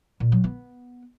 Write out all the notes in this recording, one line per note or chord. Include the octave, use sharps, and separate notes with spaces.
A#2
F#3
B3